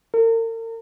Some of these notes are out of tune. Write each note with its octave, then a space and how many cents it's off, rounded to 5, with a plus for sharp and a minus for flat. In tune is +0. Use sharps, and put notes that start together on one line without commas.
A#4 -40